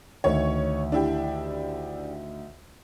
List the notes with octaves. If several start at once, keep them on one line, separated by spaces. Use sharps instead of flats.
D2 D#3 C#5
D4 E4 G4